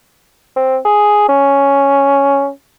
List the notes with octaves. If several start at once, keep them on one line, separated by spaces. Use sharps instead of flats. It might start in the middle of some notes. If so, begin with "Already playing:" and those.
C4
G#4
C#4